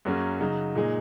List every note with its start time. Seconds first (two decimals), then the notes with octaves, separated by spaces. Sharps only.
0.05 F#2 F#3 A#3 C#4 G#4
0.40 C#3 F#3 D#4
0.75 A#2 G#3 D#4 G#4